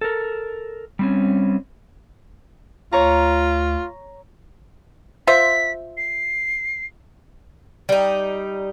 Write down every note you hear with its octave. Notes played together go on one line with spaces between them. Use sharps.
A4 A#4
G3 C4 C#4
D2 F4 C#5 A#5
F4 C5 E5 B6
C7
G3 D#4